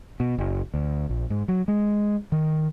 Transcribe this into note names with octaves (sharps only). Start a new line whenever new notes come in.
B2
F#1
D2
A#1
G#2
F#3
G#3
D#3